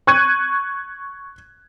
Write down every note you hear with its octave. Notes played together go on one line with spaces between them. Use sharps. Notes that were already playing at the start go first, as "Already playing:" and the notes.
C#6 F#6 G#6 D#7